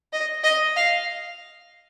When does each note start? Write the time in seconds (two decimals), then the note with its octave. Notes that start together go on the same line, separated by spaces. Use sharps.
0.13 D#5
0.44 D#5
0.76 F5